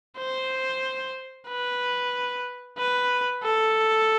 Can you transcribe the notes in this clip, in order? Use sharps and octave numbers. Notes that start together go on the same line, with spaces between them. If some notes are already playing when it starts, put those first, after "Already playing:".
C5
B4
B4
A4